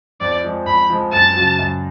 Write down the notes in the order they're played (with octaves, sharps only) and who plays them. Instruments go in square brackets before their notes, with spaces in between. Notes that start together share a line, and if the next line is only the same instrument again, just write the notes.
[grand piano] F2 [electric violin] D5
[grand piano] F3 G#3
[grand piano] F2 [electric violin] B5
[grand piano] F3 G#3
[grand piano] F#2 [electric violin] A5
[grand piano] C#3 F#3
F#2